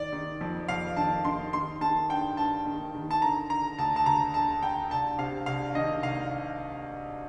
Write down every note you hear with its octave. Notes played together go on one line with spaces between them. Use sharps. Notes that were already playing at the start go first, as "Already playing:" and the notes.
Already playing: D#3 D5
D#3
F2
F2 F5
D#3 A5
D#3 C6
D#3 C6
D#3 A5
G2 G5
G2 A5
D#3
D#3
A5
D3 A#5
D3 A#5
D2 A5
A5
D2 A#5
D3 A5
D3 G5
C2 A5
C3 F5
C2 F5
D#3 D#5
C2 F5